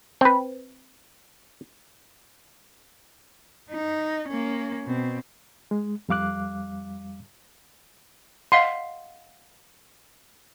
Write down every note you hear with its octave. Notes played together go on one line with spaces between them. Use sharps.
C4 B4
D#4
A#3 C#4
B2 C4
G#3
F2 G3 F5 D6 F#6
D#5 F5 F#5 C6